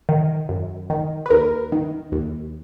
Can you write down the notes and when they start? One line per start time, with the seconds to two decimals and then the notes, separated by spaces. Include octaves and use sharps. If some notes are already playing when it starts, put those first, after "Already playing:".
0.09 D#3
0.49 F#2
0.90 D#3
1.26 B4
1.30 D#2 A#4
1.72 D#3
2.12 D#2